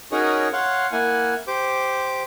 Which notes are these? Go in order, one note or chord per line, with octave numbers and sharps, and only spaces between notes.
C#4 D#4 F#4 G#4 A#4 C#5
C#5 F5 F#5 C6
A#3 E4 F#5 G#5
G4 C5 D6